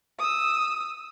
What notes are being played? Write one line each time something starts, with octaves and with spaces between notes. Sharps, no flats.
D#6 E6